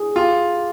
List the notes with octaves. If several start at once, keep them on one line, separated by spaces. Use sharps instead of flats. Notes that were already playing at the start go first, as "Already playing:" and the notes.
Already playing: G#4
F4 G4